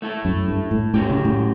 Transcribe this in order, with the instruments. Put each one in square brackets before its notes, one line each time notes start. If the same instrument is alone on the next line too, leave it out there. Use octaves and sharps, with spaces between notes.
[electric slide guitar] A3 E4 A4
[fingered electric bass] F#2
G2
A2
[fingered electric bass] A2 [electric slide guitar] F#3 C#4 G4
[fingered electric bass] C#3
A2